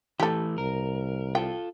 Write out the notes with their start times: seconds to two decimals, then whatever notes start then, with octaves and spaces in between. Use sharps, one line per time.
0.20 E3 A3 G4 A4
0.58 C2 A#4
1.35 F4 A4 G5